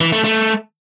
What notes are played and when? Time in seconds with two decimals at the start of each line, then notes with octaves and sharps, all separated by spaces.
0.01 E3
0.12 A3
0.24 A3